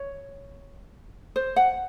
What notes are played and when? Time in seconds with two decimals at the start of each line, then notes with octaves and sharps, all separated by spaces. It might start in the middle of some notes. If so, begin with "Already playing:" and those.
Already playing: C#5
1.36 C5
1.56 F#5